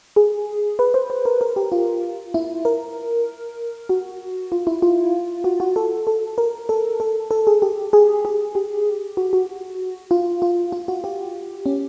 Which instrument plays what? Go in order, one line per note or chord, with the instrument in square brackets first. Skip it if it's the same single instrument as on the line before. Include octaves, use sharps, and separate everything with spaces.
[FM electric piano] G#4
B4
C5
C5
A#4
A#4
G4
F4
E4
A#4
F#4
F4
E4
F4
F#4
F#4
A4
A4
A#4
A4
A4
A4
G#4
G4
G#4
G#4
G4
F#4
F#4
F4
F4
F4
F#4
G4
C#4